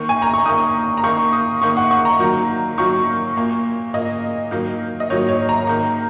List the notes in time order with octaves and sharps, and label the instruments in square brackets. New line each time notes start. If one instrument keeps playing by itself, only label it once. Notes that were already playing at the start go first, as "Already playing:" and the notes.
Already playing: [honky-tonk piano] D#3 A#3 C#6
G#5
A#5
C#6
D#3 A#3 D#6
A#5
D#3 A#3 C#6
D#6
D#3 A#3 C#6
F#5
C#6
A#5
D#3 F#3 A#3
D#3 F#3 A#3 C#6
A#2 A#3
A#2 A#3 D#5
D#3 F#3 A#3
D#5
D#3 F#3 A#3 C#5
C#5
A#5
D#3 A#3